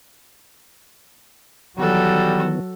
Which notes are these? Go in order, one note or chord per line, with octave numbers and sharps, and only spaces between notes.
D#3 E3 F#3 G3 B3 F#4 A4